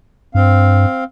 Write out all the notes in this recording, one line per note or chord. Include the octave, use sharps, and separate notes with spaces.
G2 C4 F5